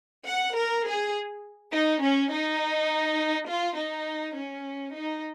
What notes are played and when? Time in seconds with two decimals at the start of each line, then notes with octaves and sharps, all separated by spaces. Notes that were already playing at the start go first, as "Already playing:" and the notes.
0.27 F#5
0.56 A#4
0.86 G#4
1.74 D#4
2.03 C#4
2.32 D#4
3.48 F4
3.79 D#4
4.37 C#4
4.95 D#4